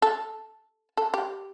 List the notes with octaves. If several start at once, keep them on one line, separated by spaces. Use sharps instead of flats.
A4
A4
G4